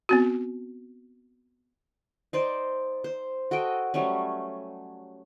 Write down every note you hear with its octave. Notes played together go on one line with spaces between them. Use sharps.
B3 C4 F#4
D#4 C5 D5
C5
F#4 A4 D#5 G5
F#3 G3 A3 C#4